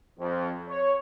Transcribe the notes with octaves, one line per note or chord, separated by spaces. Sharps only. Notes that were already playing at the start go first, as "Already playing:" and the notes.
F2
C#5